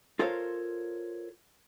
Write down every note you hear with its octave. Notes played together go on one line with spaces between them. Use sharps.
F4 A4 A#4 C5 C#5 F5